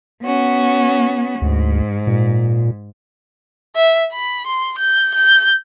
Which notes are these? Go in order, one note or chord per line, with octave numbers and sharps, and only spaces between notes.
B3 C#4 F#4
D2 G#2
A#2
E5
B5
C6
G6
G6